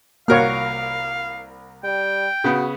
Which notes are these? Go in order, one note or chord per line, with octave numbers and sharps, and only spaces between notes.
C2 A#3 F#4 A#4 C#5 F5 F6
G3 G5
C#3 B3 F#4